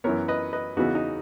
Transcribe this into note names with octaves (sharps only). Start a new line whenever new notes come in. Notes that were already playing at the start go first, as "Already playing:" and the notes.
F#2 E3 B3 A#4 C#5
B4 D#5
B4 D#5
E2 C#3 E3 B3 D#4 F#4
D#4